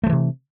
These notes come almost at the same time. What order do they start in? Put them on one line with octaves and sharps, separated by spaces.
A3 F3 E3 C3